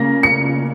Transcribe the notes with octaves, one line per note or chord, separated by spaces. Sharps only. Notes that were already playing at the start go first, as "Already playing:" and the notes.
Already playing: C#3 A#3 A#6
C#7